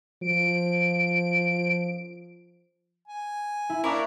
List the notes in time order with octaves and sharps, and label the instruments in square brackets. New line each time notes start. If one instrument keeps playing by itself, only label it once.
[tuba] F3 [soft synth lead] D7
[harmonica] G#5
[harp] E4
[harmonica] A#3 D4 A#4 [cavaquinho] E4 C#5 [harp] B5 D6 F#6